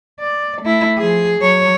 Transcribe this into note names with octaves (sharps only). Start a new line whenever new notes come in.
D5
A3 E4
F3 G#4
F#3 C#5